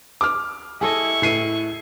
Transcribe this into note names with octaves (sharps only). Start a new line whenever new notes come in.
D6 F6
E4 G#4 A4 D#5 C#6
A2 C7 D#7